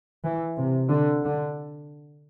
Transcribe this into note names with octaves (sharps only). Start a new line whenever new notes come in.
E3
C3
D3
D3